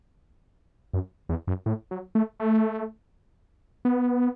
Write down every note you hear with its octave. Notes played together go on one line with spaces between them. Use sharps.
F#2
E2
F#2
A2
F#3
A3
A3
B3